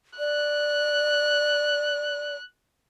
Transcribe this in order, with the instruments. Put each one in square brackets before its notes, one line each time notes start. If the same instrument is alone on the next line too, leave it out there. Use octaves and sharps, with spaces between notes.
[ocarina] D5 [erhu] F#6